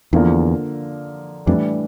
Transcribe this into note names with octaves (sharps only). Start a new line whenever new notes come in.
E2 D3 F3 A#3
F2 A2 E3 G3 D4